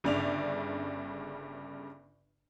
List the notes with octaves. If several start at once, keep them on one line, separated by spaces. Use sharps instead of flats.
G1 G2 C#3 D5 E5 F7